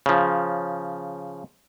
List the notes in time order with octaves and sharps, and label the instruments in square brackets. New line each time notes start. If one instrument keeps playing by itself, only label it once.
[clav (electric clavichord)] C#3 F3